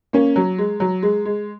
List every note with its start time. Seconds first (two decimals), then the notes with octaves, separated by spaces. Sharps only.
0.13 A#3 C#4
0.36 F#3
0.58 G#3
0.80 F#3
1.03 G#3
1.25 G#3